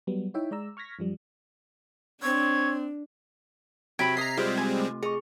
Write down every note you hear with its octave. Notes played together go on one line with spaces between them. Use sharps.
F#3 G3 B3
D#4 E4 C#5 E5 G5
G#3 D5 A#5 E6
C#6 F6 G#6 A#6 B6
F#2 F3 G3
C4 D4 C#5
C3 F#3 G5 B5 G#6 B6
D#5 A#5 D#6 C7
G3 G#3 C4 F4 G5
G#5
A3
G#4 D#5 C#6